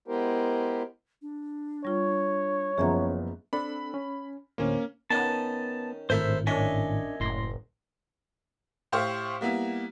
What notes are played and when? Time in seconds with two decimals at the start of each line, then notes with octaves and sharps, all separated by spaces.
0.08 G#3 B3 E4 G4 A#4 C5
1.22 D4
1.85 G3 F4 C#5
2.78 F#1 F3 B3 C#4 G#4 E5 A#5
3.53 C4 D4 A4 B5
3.94 C#4
4.58 D2 A2 A#3 C#4 C5
5.10 D#3 B3 C#4 D#4 A5
6.10 G#1 A2 E4 A4 A#4 C5 E5 E6
6.47 F#2 D4 C#5 D#5 E5 G#5
7.20 F#1 A2 C6 A#6
8.92 A2 G4 C5 E5 F5 C#6
9.41 G3 A#3 B3 E4